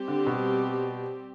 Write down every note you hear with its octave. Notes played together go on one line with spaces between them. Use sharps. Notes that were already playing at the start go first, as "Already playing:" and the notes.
Already playing: G3 C4 G4
D3
B2